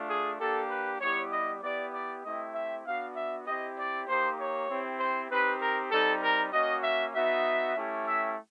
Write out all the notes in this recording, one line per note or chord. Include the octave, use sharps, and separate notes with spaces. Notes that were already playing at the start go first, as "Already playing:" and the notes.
Already playing: A3 D4 F4
G#4
A#3 D4 G4 A4
B4
G3 B3 E4 G4 C#5
D#5
B3 E4 G4 D5
D5
A3 C4 E4 G4 D#5
E5
B3 D4 F#4 F5
E5
C4 E4 G4 D#5
D5
A#3 D#4 G4 C5
C#5
C4 E4 G4
C5
C4 D#4 G4 B4
A#4
G3 C4 D#4 A4
A#4
A#3 C#4 F#4 D#5
E5
B3 D#4 F#4 E5
A3 C#4 E4 G4
E5